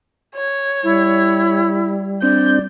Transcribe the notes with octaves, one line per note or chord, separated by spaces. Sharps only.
C#5
G3 E4
C4 D4 D5 G6